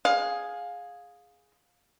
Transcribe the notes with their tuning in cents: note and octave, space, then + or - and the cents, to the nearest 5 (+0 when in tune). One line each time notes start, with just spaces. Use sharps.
G#4 +0 F5 +20